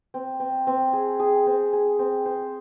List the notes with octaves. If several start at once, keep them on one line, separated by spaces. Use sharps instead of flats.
C4
C4
C4
G#4
G#4
C4
G#4
C4
C5